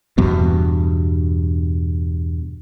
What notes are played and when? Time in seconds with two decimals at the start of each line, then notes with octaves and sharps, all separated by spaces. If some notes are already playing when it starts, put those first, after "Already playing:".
0.18 E2 G2 B2